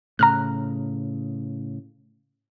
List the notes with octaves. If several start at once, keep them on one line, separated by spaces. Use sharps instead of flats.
A2 C#3 A#5 F6 F#6